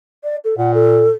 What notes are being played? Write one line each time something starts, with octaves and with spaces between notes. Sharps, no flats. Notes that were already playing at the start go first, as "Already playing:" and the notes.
D5
A4
A#2 F#5
A4